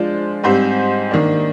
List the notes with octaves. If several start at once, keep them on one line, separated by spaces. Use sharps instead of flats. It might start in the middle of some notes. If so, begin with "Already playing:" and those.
Already playing: F3 G#3 D4 F4 C5
G#2 G3 C4 G4 C5
D#3 A#3 D4